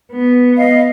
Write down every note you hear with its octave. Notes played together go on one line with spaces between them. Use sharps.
B3
D#5 F5